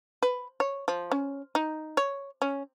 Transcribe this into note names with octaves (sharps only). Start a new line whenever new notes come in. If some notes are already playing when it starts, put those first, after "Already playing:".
B4
C#5
F3
C#4
D#4
C#5
C#4